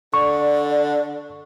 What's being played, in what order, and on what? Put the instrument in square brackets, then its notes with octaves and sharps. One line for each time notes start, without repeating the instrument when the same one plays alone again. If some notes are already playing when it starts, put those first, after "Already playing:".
[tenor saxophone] D3 [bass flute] D5 [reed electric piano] C#6